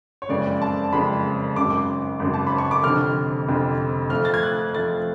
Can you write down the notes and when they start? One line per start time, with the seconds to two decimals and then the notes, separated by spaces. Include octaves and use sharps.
0.22 C#5
0.29 F#1 F2 C#3 G#3 D5
0.62 A5
0.93 F#1 F2 C#3 G#3 B5
1.56 G#1 F#2 C#3 D6
2.19 G#1 F#2 C#3
2.34 A5
2.47 B5
2.58 C#6
2.71 D6
2.84 F1 F2 D3 F6
3.47 F1 F2 D3
4.10 F2 F3 A3 F6
4.25 A6
4.34 G#6
4.43 F#6
4.74 F2 F3 A3 A6